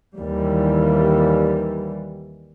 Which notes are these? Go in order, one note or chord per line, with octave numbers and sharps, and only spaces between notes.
D#2 E3 G3